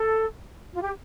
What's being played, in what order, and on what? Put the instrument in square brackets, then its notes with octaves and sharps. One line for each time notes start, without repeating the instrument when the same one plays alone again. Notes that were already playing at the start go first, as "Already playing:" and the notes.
Already playing: [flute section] A4
F4
G4